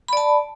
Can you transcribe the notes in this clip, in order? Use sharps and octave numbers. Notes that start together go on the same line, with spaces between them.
D5 A5 B5